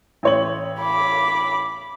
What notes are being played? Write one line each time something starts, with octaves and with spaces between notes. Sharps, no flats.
A1 C#5 F#7
B5 D6